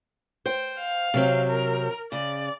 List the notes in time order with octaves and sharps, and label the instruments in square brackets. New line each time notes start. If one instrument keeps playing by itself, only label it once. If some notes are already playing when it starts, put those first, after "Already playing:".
[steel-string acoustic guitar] C5 G5
[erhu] F5
[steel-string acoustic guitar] C3 F#3 C4
[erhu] A#4
[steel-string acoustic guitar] C#3 [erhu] D5